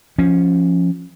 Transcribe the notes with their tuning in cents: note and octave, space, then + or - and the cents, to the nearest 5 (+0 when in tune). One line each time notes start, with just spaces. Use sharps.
F3 +0 C#4 -5